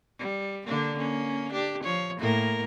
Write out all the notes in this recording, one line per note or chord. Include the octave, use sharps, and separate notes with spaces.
G3
D3 A#3 D4
A#3 C#4
D4 G4
F3 C#5
A2 A#3 A#4